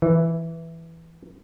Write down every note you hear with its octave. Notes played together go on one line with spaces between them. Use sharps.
E3